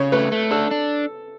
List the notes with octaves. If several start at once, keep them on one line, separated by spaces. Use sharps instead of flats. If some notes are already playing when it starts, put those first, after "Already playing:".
Already playing: C#3 C#5
A3 B4
A3
D4 A4
D4